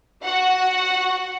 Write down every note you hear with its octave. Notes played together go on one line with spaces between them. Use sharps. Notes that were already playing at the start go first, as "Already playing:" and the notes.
F#4 F#5